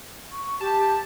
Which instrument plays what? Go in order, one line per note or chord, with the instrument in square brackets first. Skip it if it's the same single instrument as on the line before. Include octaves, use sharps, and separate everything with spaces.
[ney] C#6
[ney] G4 [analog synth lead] A5